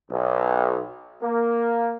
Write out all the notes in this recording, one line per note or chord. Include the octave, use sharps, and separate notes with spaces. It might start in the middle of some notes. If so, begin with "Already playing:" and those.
B1
A#3